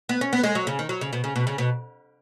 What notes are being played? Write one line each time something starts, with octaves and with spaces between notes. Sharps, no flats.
B3
C#4
B3
G#3
F#3
C#3
D#3
F#3
C#3
B2
C#3
B2
C#3
B2